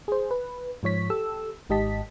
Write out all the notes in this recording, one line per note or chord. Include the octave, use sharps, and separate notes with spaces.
G#4 C5
B4
G#2 F3 C#5 B6
G4 A4 E6
G#1 G#2 G4 D#5 A5 B6